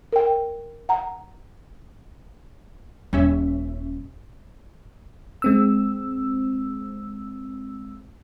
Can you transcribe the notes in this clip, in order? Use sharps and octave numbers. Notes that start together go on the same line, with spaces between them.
A#4 G5
F#5 A#5
D#1 G3 C#4 E5
G#3 C4 E6